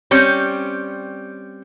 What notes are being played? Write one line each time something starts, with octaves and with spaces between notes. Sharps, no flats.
G3 C4 C#4